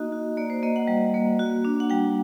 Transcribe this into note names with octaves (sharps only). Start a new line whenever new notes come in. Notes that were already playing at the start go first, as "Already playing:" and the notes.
Already playing: A#3 D#4 F#4 D#5
F#4
A#3 D5
C5
A#3 D#5
F#5
G3
A#3
F#4
D4
F#5
G3 G5